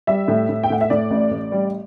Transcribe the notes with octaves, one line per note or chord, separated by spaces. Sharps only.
G3 E5
A2
A2
G5
A2 F#5
E5
A2 D5
A1
A1
G3